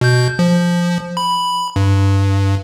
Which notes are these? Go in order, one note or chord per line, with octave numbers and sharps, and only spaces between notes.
B2 G6
F3
B5
G2